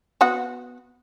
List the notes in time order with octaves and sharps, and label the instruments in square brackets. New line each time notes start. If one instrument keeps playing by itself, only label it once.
[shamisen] B3 F#4 F#5